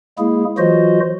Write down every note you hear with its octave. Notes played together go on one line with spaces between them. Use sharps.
G#3 A#3 E4 G#4
E3 F#3 F4 F#4 C5 D#5